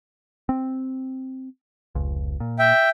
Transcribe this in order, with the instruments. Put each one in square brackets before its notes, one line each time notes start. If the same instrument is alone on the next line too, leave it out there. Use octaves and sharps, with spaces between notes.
[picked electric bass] C4
F1 C#2
A#2
[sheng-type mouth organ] E5 G5